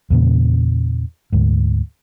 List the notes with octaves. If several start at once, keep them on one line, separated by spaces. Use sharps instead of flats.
E2 A#2 C#3
D2 G#2